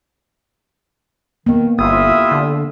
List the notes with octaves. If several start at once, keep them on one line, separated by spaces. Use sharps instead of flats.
D#3 A#3 B3
G1 E4 F4 G4 E5 D#6
D3